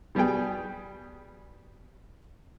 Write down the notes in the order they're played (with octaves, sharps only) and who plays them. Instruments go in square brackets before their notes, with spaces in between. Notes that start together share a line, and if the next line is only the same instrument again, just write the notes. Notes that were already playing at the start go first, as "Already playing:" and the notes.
[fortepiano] B2 G3 B3 G#4 G5